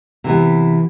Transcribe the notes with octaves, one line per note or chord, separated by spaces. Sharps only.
C3 E3 B3